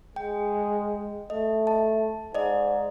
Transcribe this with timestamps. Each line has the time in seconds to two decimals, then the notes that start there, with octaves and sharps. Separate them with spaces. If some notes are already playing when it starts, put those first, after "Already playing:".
0.16 G#3 G5
1.30 A3 D#5
1.67 A5
2.35 G#2 D5 D#5